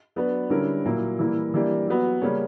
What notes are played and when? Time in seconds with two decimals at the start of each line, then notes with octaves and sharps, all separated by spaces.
0.16 F#3 B3 D4 F#4 B4
0.50 D3 G3 C#4 E4 A#4
0.85 A#2 F#3 A#3 E4
1.19 E3 G3 A#3 E4
1.54 E3 G3 A#3 D4 G4
1.87 F#3 B3 F#4
2.22 C#3 G3 A#3 C#4